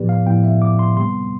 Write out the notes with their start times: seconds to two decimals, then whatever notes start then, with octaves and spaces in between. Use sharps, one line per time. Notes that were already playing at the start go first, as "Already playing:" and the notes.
Already playing: A2 F3 B3 G4 B4 D5
0.09 F5
0.26 A2 F3 B3 G5
0.44 E5
0.62 D6
0.79 C6
0.97 C3 G3 B3 C6